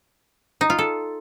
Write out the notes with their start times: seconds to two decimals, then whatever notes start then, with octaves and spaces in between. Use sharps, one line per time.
0.61 D#4
0.70 F4
0.79 A4